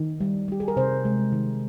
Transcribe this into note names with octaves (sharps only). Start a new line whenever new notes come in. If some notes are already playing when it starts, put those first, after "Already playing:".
Already playing: D#3
G3
G3 G4
G#4
A#4
C3 C5
G#3
D#3